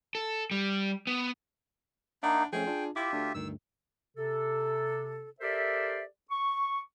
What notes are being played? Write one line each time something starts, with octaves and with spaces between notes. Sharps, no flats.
A4
G3
B3
A#3 D4 D#4 E5 F#5 B5
F3 A3 C#4 G#4 G5
D4 F4
E4 F4 G4 E5 D6
D2 D4
D2 G2 D#3 E6
C3 A4
G4 A4 A#4 C5 D5 E5
C#6